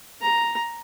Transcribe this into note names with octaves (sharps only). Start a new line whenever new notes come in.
A#5